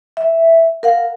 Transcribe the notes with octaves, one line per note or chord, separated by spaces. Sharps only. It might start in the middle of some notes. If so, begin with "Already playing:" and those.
E5
A#4 F5 F#5